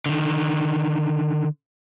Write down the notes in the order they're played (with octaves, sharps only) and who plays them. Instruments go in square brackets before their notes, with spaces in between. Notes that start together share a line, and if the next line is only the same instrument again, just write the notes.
[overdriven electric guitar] D3 D#3